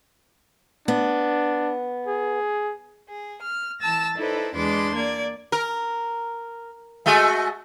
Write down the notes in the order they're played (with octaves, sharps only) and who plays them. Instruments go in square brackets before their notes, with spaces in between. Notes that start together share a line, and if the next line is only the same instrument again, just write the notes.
[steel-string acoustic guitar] B3 [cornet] D4
[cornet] G#4
[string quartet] G#4
F6
E3 A5 E6 A6 A#6
D#4 E4 A4 B4 C5 D5
E2 G#3 D4 B4 C6 D6
A#3 D5 G#6
[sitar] A#4
G#3 A3 F#4